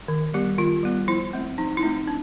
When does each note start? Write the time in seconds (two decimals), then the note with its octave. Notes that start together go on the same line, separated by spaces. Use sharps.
0.08 D#3
0.34 G3 B3 G4
0.58 D#3 F4
0.83 G3 B3
1.08 F3 E4
1.33 A3 C4
1.58 F3 D#4
1.77 E4
1.83 A3 C4 D#4
2.07 D4